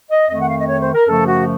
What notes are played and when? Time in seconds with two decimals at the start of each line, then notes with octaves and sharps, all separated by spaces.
0.10 D#5
0.29 F2 D#3 A3 D#5
0.40 F#5
0.49 F5
0.59 D#5
0.68 C#5
0.81 C5
0.95 A#4
1.08 F#2 C#3 F3 A3 A4
1.27 F#4